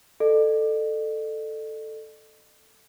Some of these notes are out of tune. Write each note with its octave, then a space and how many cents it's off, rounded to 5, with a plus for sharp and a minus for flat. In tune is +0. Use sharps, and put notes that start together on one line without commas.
A4 +0 D#5 -45